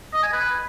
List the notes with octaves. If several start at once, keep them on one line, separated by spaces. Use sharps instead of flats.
D#5
G#5
B4